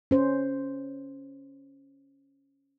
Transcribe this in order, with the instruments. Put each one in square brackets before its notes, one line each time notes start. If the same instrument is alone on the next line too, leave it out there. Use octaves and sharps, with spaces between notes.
[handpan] C#4 C5